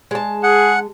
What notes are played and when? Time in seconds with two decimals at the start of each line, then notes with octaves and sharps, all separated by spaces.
0.11 G#3 A5
0.43 G#4 F#5